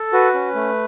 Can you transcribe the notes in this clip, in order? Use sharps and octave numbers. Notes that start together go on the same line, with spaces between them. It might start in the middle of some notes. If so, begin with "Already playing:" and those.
Already playing: A4
F#4 B4
C#4
A3